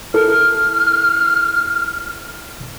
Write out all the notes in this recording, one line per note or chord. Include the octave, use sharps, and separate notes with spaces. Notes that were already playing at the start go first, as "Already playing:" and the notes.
E4 A4 A#4 F6